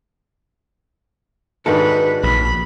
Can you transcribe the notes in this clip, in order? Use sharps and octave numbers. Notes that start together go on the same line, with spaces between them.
G#2 D#3 D4 F#4 A4 B4
A#1 B5